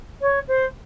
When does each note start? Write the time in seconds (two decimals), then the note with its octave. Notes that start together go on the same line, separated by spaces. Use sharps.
0.21 C#5
0.48 C5